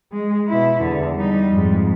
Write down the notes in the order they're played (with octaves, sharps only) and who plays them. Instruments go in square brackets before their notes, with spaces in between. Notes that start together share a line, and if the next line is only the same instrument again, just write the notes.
[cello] G#3
B2 E4
E2 D3
G3 D#4
F2 G#2